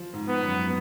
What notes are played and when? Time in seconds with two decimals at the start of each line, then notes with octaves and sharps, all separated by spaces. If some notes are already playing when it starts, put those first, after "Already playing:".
Already playing: F3
0.13 G#2
0.28 B3
0.42 F#2